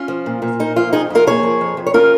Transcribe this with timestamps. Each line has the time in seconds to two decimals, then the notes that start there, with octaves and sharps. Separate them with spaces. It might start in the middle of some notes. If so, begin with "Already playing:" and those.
Already playing: C#4 F4
0.08 F3
0.26 A#2
0.42 A#2
0.60 A#3 D#4
0.76 F3 F4
0.93 F2 D#4 G#4
1.10 F2 F4 A#4
1.27 A#3 G#4 C#5
1.43 F3
1.61 F2
1.77 F2
1.87 C#5
1.94 C#4 F4 A#4